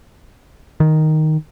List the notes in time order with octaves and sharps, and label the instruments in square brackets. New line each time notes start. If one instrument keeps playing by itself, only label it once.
[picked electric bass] D#3